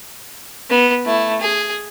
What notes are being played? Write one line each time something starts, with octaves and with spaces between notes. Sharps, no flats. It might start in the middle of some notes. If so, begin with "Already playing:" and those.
B3
A3 E4
G#4